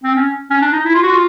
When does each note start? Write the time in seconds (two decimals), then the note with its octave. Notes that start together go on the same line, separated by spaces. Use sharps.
0.04 C4
0.15 C#4
0.50 C#4
0.62 D4
0.73 D#4
0.85 E4
0.94 F4
1.03 F#4
1.11 F4